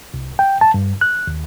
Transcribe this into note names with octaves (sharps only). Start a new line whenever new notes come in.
C2
G5
A5
G2
F#6
D#2